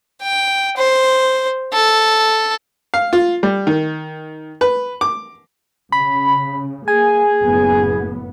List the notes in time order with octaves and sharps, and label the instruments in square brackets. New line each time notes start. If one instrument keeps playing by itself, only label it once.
[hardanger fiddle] G5
C5
A4
[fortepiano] F5
F4
G3
D#3
B4
D6
[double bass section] C#3 [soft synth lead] B5
[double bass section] A#3 [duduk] G#4 [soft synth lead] G#5
[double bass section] F#1 A2 B3